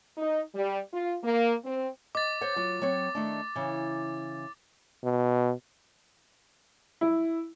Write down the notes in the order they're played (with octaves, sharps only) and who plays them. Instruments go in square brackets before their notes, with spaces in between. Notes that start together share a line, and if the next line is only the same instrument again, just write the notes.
[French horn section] D#4
G3
F4
A#3
C4
[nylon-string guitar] D#5 [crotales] D6 A6
[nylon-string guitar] C5 C#5 F#5
F#3 F4
F#3 C4 C#5
D#3 A3 D4
C#3 E3
[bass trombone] B2
[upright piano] E4